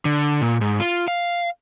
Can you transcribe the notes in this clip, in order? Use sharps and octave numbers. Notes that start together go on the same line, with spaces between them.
D3
A#2
G#2
F4
F5